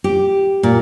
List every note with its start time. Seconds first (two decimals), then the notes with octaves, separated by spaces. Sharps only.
0.04 G4
0.63 A#2